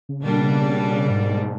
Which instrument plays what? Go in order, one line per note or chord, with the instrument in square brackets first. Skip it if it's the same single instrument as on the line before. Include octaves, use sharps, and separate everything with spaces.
[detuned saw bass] C#3
[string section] B2 G3 A#3 D4 [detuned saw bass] D3
[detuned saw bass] C#3
G#2